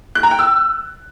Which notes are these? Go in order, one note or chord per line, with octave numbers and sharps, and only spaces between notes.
F#6
A#5
G5
E6